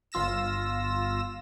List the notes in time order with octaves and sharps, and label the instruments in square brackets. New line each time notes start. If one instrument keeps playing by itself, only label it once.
[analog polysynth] G1 F4 E6 A#6 E7